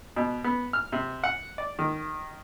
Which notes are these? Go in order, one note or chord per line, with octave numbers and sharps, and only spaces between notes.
B2
B3
F6
C3
F#5
D5
D#3